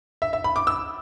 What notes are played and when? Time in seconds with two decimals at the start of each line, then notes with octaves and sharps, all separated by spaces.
0.22 E5
0.33 E5
0.44 B5
0.56 D6
0.67 E6